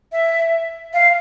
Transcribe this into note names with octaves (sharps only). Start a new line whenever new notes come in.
E5
F5